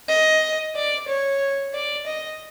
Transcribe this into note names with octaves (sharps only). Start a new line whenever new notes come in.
D#5
D5
C#5
D5
D#5